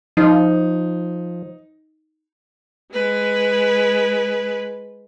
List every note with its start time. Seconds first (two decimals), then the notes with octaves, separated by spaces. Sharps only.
0.17 F3 D#4
2.93 G#3 B4